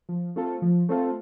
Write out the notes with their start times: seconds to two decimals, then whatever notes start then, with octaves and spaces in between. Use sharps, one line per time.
0.09 F3
0.36 A3 C4 F4 A4
0.62 F3
0.89 A3 C4 F4 A4